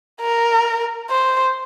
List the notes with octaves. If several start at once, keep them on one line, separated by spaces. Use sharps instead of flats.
A#4
C5